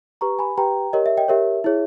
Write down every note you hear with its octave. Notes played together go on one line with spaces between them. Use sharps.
G4 B4 A#5 C#6
G#5 B5
G4 B4 G5 A#5
G4 A#4 C#5 D#5
E5
D#5 G5
G4 A#4 C#5 E5
E4 G#4 C#5